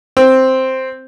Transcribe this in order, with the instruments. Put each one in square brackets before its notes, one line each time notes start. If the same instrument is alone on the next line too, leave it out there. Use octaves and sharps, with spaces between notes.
[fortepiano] C4